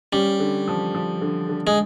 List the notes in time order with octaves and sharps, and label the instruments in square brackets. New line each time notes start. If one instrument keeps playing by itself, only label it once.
[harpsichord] G3 [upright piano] C#4
[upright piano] D3
F3
F3
D3
D3
[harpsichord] G#3